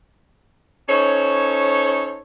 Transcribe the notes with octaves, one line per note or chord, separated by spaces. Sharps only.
C#4 D#4 A4 C5 C#5